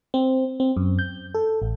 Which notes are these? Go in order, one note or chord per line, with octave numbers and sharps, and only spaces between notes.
C4
C4
F#2
G6
A4
A1